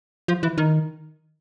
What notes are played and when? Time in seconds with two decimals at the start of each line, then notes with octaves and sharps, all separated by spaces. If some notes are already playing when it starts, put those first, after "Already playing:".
0.28 F3
0.43 E3
0.58 D#3